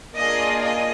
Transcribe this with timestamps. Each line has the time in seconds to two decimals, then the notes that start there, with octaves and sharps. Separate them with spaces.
0.16 A#3 D4 F4 G#4 D#5
0.63 D#5